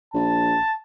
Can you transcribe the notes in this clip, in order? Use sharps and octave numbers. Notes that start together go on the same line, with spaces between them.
A#1 A5